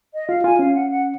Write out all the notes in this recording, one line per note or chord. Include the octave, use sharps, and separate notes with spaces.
D#5
F4 F5
F4 G#5
C#4 F5
F#5
F#5